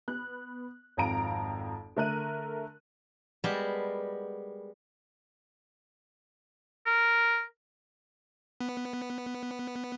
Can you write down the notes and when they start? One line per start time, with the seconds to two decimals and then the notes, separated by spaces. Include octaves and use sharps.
0.08 B3 F#6
0.97 G#1 F2 F5 A#5 D7
1.96 D3 A3 A#4 E5 F#6 D#7
3.44 G3 G#3 B3 G4 A#4 A5
6.86 A#4
8.61 B3